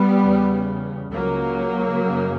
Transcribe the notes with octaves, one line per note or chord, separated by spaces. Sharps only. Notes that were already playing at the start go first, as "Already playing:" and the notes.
Already playing: G3 B3
E2 C#3
C#2 C#3 F#3 A#3
F#2 C#3